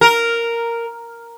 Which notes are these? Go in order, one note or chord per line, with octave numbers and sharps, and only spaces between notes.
A#4